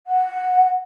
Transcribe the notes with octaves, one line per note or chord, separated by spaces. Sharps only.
F#5